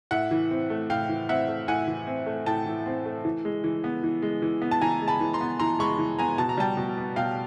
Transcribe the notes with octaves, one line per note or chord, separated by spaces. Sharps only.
A2 E5 F#5
E3
C4
A3
A2 F5 G5
E3
C4 E5 F#5
A3
A2 F#5 G#5
E3
C4
A3
A2 G5 A5
E3
C4
A3
E3
G#3
E3
B3
E3
G#3
E3
B3
A5
E3 G#5 A#5
G#3
A5 B5
E3
A#5 C6
B3
E3 A#5 C6
G#3 B5 C#6
E3
B3 G#5 A#5
B2 A5
A#5
G3 G5 A5
B2
B3
B2 F5 G5